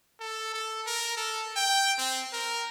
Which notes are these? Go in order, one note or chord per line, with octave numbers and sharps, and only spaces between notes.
A4
A4
A#4
A4
G5
C4
A#4